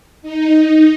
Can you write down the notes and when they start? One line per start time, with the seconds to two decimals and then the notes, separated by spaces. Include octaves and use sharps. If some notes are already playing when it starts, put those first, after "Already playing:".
0.22 D#4